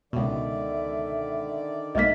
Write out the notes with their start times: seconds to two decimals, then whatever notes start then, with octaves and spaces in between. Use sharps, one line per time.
0.13 C#2 B2 D3 D#3 D5 E5
1.95 B1 G#2 A#3 D#5 E5 B6